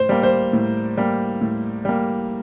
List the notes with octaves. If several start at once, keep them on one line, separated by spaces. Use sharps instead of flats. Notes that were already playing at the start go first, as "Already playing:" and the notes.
Already playing: A2 C5
G3 A#3
C5
A2
G3 A#3
A2
G3 A#3